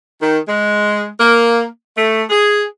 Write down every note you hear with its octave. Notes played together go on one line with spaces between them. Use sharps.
D#3
G#3
A#3
A3
G#4